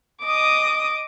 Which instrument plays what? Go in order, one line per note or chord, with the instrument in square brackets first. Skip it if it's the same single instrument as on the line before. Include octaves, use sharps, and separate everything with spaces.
[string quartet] D#5 D6 D#6